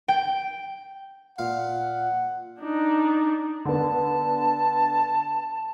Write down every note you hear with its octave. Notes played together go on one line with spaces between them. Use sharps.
G5
A#2 F5 F#5
D4 D#4
D3 B3 A5